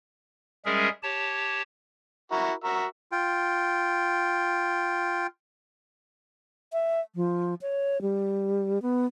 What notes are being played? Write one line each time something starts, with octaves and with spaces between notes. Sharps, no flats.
G3 G#3 C#4 G#4 A#4 E5
G4 C#5 A5
E4 F#4 A#4
F#4 A#4 E5
F4 G5
E5
F3
C#5
G3
B3